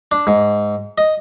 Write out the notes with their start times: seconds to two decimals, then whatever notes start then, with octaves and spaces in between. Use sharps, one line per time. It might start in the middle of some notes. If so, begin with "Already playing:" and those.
0.12 D4
0.27 G#2
0.98 D#5